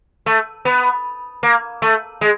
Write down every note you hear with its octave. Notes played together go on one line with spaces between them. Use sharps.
A3
B3
A#3
A3
G#3